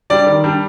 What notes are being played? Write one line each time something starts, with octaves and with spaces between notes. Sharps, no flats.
G3 D4 D5
D#3
G3 D4